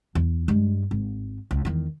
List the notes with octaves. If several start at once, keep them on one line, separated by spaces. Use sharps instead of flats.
E2
G2 G#3
G#1
C#2
E2 D#3